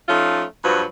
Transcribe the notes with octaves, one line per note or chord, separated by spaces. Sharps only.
F3 A3 C#4 D#4 F4
G2 F3 F#3 F#4 B4